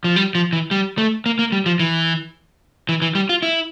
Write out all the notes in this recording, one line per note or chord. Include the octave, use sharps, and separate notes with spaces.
F3
G3
F3
E3
G3
A3
A#3
A#3
G3
F3
E3
E3
E3
G3
F4
E4